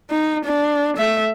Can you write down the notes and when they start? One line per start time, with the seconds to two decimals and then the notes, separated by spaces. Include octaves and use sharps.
0.10 D#4
0.45 D4
0.97 A3 E5